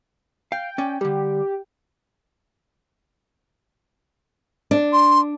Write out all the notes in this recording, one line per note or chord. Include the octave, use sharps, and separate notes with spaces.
F5 G5
C#4 D5
D3 G3 G4
D4
C6